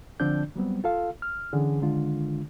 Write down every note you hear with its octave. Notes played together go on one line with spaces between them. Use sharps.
D3 F3 C4 D4 D5 G6
F#3 G3 B3 C4
F4 A4 F5
F6
D3 E3 C#4 G#4
D3 D#3 G#3 D4 F4